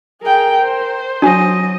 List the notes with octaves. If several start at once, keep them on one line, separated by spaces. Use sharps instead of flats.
G#4 A#4 G5
C5
F#3 D4 F#4 D#5 G#5